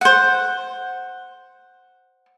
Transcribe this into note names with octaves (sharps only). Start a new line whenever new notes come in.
C5 F#5